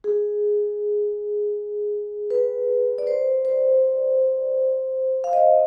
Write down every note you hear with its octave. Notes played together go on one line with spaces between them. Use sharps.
G#4
B4
D5
C5
C5
F5
D#5